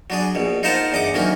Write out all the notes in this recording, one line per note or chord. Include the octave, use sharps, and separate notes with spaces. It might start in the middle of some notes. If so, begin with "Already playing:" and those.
F#3 D4 G#4
A#1 B2
D#4 F4 A#4 C5 F#5 A5
E2 G2 D#5 F#5 D6
D2 D#3 F#3 A#3 C#4